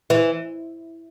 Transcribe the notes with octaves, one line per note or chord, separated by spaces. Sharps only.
E3